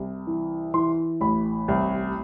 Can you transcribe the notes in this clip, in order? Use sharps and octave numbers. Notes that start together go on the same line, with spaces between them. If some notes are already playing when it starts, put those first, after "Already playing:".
Already playing: C2
E3
E3 C6
A1 B5
C2